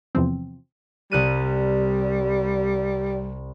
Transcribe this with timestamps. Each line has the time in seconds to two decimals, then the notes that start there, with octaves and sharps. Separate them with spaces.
0.15 E2 C3 F3 C4
1.12 C2 G3 F#6 D#7